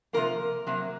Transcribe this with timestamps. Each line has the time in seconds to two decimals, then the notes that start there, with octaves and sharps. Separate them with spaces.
0.13 C3 F3 A#3 A#4
0.66 C3 F#3 A#3